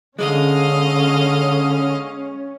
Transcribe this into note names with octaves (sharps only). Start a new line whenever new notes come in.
D3 G#3 C#4 D#5 F5